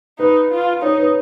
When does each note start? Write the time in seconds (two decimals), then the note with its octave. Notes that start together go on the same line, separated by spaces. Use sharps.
0.19 D#4 B4
0.51 F4
0.82 D#4 C#5
0.98 B4